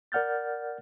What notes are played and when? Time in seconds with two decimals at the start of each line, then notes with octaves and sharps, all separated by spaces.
0.12 A#4 D5 F#5 F6 G6 A6